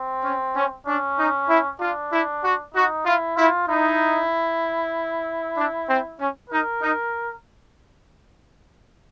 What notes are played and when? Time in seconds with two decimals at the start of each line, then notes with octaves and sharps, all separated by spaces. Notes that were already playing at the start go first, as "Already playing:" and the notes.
Already playing: C4
0.24 C#4
0.55 C#4
0.86 C#4 D4
1.18 D#4
1.49 E4
1.80 D4 F4
2.12 E4
2.44 F#4
2.74 D#4 F#4
3.05 E4 F4
3.37 E4 F4
3.68 D#4 E4
5.56 D4
5.88 C4
6.19 C#4
6.50 D#4 A#4
6.82 D#4